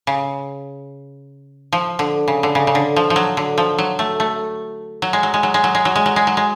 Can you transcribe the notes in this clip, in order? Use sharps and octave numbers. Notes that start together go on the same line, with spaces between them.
C#3
F3
D3
C#3
D3
C#3
C#3
D3
F3
F3
F#3
D3
F3
F#3
A3
A3
F#3
G#3
F#3
G#3
F#3
G#3
F#3
G#3
F#3
G#3
F#3
G#3
F#3
G#3